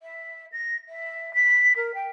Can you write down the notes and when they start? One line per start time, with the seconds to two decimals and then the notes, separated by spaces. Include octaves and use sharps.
0.02 E5
0.52 A#6
0.89 E5
1.34 B6
1.76 A#4
1.94 G5